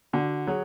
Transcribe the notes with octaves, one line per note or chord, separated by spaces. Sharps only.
D3 F#4
F#3 G#4